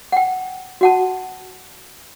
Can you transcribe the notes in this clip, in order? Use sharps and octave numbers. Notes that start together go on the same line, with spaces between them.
F#5 G5
F#4 F#5 A5